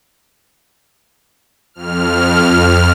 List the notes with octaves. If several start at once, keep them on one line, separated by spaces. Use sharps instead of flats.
F2 F6